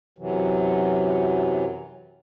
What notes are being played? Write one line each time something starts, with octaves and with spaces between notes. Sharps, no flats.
F#2 C3 E3 F#3